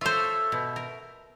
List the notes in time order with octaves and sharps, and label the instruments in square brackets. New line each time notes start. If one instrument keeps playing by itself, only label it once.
[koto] F4 C5 [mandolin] A4 C#5 E5
[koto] B2
A#4